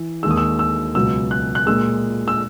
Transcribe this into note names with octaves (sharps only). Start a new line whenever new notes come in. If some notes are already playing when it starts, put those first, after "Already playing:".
Already playing: E3
D#2 D#3 G#3 E6
D#6
E6
E6
C#2 B2 F#3 E6
F#6
F#6
A#2 G#3 E6
E6